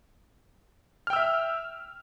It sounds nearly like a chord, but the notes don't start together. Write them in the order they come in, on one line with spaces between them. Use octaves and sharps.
F6 G5 E6 E5